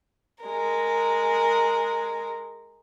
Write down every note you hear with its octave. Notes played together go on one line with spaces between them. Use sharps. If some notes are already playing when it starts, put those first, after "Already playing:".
G#3 A#4